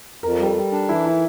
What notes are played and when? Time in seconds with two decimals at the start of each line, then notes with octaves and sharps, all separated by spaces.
0.23 F2 A#4
0.40 G3
0.45 A4
0.56 G3
0.72 D4
0.89 E3 E4
1.06 E4